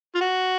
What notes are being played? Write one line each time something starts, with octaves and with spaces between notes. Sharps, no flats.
F4
F#4